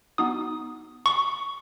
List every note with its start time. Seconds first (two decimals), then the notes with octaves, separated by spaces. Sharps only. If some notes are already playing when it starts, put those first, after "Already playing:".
0.18 B3 D#4 F#4 D#6
1.06 C#6